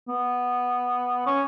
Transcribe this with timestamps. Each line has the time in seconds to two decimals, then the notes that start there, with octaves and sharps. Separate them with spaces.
0.08 B3
1.26 C#4